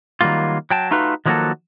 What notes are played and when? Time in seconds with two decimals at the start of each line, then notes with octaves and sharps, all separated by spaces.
0.21 D#3 F#3 G3 A#3 F4
0.71 F#3 G5 A5
0.91 A3 D#4 F4 F#4 B4
1.25 D#3 F3 F#3 A#3 F#4 A4